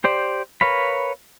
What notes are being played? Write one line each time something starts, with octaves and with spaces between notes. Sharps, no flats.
G4 C5 D5
A#4 B4 C#5 F5 B5